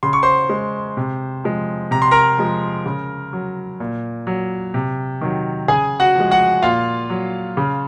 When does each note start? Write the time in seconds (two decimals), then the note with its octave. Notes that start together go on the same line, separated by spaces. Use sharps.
0.03 C#3 C6
0.13 C#6
0.23 C5 C6
0.49 G#3
0.97 C3
1.44 F3 G#3
1.91 C3 A#5
2.02 C6
2.11 A#4 A#5
2.38 F3 G#3
2.86 C#3
3.33 F#3
3.80 A#2
4.27 F#3
4.74 C3
5.21 D#3 F#3
5.68 C#3 G#4 G#5
6.00 F#4 F#5
6.15 F3 G#3
6.31 F#4 F#5
6.62 A#2 F4 F5
7.10 F#3
7.57 C#3